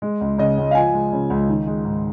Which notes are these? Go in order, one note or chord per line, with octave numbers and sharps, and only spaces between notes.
G#3
C#2
C#3 D#5
C#2
F5
F3 G#5
G#3
C#3
C#2
D#3
G#3
G#2